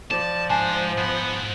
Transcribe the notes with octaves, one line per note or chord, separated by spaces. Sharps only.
F3 D5 A5 E7
G#2 D4 C5 G#5 A5
G#2 B3 F#5